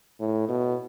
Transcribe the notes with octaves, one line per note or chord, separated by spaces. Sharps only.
A2
B2